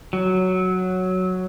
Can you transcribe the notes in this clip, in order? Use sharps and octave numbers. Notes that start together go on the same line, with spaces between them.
F#3